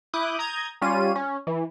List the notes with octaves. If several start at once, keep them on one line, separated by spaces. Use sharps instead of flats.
E4 D6 D#6 F#6 G6
A#5 D#6 G6 G#6
G3 C#4 F4 D#7
C#4
E3